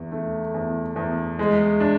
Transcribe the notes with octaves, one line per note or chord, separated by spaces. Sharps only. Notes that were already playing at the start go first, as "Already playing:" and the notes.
Already playing: E2
A3
E2
E2
G#3
D4